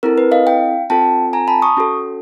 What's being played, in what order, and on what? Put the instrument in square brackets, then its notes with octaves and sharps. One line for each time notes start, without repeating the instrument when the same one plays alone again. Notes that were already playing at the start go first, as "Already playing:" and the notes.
[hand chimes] C4 E4 A4 A#4
B4
D#5 F5
F5 G5
C4 F4 A4 G5 A5
G#5 A#5
A5 B5
C#6 D#6
C#4 F#4 A4